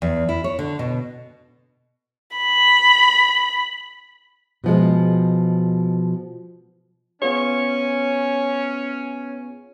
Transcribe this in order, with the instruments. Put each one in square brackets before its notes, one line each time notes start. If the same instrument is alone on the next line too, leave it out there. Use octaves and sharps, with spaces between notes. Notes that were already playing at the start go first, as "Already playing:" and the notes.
[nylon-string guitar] E2
E4
C#5
D3
B2
[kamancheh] B5
[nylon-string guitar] B2 F3 G#3
[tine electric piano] B3 F4 G#4 [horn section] C#4 [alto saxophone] C#5